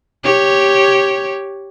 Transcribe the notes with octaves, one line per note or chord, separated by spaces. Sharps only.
G4 C#5